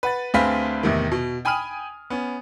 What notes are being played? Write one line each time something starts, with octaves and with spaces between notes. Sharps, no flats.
B4 F#5 A6
D2 C4 G#4 B4 F5 B6
E2 A2 C3 D#3
B2
G5 G#5 B5 D#6 F6 D#7
B3 C#4